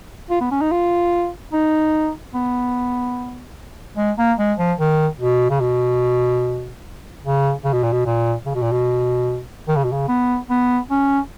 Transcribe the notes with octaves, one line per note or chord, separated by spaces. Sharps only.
F4
B3
C#4
D#4
F4
D#4
B3
G#3
A#3
G#3
F3
D#3
B2
C#3
B2
C#3
C#3
B2
A#2
B2
A#2
C#3
B2
A#2
B2
D#3
C#3
B2
C#3
B3
B3
C#4